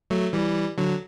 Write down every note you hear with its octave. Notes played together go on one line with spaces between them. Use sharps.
F#3 A3
E3 G3
D3 F#3